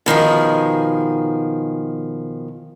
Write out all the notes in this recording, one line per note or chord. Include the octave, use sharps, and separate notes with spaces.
B2 D#3 F3 G#4